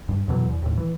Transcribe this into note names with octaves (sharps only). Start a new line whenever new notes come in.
G2
F2 B2 E3 F#3
E2
D#2 A2
E3